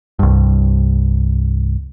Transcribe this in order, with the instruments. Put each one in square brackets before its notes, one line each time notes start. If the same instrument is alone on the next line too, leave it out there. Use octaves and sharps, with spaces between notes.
[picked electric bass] C2 G2